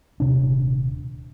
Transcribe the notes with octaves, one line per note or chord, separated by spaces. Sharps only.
D#1 C3 D4